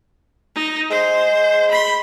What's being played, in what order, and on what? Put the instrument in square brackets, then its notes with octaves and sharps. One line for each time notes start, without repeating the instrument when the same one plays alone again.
[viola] D#4
[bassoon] G#3 [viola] C5
[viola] B5 C6